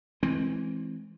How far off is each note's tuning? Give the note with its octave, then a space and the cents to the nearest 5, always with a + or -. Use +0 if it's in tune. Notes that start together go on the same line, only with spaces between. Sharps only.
E3 +0 G#3 +30 C4 +15